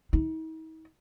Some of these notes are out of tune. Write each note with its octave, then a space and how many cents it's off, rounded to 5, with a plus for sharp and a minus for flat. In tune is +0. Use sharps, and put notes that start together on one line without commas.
D#4 +45